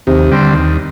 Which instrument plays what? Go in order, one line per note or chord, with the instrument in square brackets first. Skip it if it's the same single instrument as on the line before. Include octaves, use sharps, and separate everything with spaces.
[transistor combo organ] D#2 [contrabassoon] C3
[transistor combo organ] D3 G3 C4
D#2